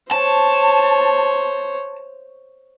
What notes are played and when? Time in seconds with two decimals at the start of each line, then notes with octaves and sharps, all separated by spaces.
0.11 C5 C#5 A5